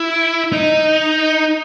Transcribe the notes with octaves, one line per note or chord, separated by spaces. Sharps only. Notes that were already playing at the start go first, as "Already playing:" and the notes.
Already playing: E4
D#4